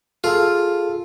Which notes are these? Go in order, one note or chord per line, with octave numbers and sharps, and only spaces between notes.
F4 G#4 A4